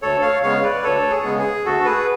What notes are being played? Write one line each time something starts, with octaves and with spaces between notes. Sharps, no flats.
D2 A4 C#5
C#5 F5
C#3 G#3 B3 C#5 F5
B4 D5
D2 A4 C#5
G#4
C#3 G#3 B3
G#4
D2 F#4 A4
G#4 B4